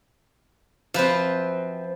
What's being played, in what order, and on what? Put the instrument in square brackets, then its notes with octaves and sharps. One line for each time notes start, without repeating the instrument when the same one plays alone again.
[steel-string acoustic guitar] F#2 C4 [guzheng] F3 B4 C5